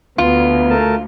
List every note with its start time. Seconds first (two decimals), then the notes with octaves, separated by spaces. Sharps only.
0.18 D2 B3 F4
0.70 A3 A#4 A5